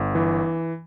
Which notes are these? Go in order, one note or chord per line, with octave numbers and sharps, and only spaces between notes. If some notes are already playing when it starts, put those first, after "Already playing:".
Already playing: G1
E3